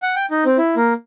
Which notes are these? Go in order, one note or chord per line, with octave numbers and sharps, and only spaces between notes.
F#5
G5
D#4
C4
E4
A#3